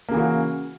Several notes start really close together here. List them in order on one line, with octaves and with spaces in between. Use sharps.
A#3 C#3 E3 F#4